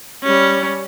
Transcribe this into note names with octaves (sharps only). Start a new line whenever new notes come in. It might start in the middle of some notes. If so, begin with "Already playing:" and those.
G3 C#4